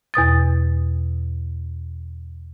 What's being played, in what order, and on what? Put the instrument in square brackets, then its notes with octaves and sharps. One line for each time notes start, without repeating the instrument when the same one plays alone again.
[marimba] E2 B2 D#6 A6